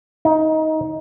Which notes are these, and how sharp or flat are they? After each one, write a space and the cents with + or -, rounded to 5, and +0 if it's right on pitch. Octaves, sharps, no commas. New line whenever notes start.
D#4 +15